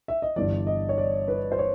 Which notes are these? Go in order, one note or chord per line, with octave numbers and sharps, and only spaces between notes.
E5
D#5
G1 G2 E3 D5
D#5
C#5
D5
B4
C5
C#5